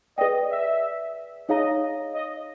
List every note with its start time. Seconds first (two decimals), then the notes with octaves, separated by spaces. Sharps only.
0.18 G#4 B4 D5 D#5 G5
0.51 E5
1.49 D#4 G#4 C#5 D#5 F5 A#5
2.14 D#5